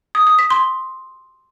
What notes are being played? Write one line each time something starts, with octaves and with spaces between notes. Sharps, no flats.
D#6
D#6
B6
C6